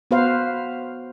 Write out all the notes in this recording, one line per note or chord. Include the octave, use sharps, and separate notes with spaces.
B3 F#4 B4 C5 F5